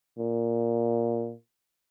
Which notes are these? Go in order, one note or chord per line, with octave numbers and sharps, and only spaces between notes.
A#2